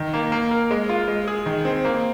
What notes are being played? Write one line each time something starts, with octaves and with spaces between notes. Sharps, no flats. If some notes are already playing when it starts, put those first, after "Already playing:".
Already playing: D#3
A#3
A#3
A#4
G#3
F4
G#3
G#4
D#3
C4
A#3